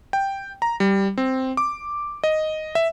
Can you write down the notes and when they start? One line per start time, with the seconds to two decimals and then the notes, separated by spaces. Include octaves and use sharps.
0.13 G5
0.62 A#5
0.80 G3
1.18 C4
1.57 D6
2.24 D#5
2.75 E5